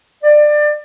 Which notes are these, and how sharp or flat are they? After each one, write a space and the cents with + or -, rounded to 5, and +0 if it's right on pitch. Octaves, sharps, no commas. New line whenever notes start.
D5 +25